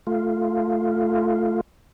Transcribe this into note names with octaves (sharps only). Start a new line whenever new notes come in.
A3 F4